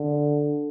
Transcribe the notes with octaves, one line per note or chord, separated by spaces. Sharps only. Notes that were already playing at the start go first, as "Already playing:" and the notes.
Already playing: D3